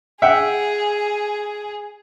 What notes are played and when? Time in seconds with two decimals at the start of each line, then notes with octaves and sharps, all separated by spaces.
0.22 G#4 E5 F#5 G5